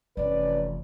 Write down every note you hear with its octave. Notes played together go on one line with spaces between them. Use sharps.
F1 E3 C#4 B4 D5